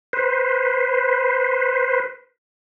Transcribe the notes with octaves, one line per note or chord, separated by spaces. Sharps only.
B4 C5